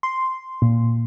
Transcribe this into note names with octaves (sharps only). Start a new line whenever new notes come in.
C6
A#2